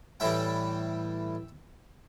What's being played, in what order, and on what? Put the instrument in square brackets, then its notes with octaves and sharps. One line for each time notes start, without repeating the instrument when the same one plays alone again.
[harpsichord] A2 E3 G3 E5 G5